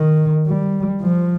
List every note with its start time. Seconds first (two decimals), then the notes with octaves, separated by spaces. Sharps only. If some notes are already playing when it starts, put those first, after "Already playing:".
Already playing: D#3
0.47 G3
1.02 F3